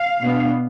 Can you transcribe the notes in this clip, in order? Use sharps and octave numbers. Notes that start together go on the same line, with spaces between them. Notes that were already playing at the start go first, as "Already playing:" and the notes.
Already playing: F5
B2 B3 D4